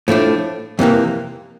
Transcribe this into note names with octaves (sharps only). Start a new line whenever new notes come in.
A2 F3 A3 D4
F2 C3 E3 A#3